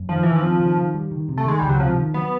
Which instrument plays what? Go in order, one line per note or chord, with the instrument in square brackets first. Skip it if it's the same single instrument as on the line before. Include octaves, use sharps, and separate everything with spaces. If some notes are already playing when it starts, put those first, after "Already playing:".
Already playing: [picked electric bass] F#2
[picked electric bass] D#3 [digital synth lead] F3
[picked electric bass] D#3 [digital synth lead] E3
[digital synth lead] F3
[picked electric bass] C4
D#3
D#3
G3
D#3
C3
[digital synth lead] A3
[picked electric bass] D#3 [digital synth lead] G#3
[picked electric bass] C#2 [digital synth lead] G3
[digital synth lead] F#3
[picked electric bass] C3 [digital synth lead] F3
[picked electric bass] D#3
[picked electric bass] F#3 [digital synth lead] B3